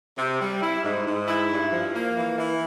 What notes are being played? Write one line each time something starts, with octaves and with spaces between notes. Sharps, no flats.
C3
G3
E4
G#2
G#2
E4
G2
F3
A#3
E3
E3